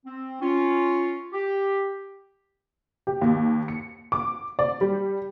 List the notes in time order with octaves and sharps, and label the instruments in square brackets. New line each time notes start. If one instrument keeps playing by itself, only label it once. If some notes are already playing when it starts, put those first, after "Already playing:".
[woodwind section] C4
C#4 F4
G4
[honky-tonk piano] G4
D#2
C#7
D6
D5
G3